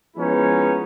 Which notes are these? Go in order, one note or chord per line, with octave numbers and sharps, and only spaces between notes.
F3 G#3 B3 C#4 D#4 E4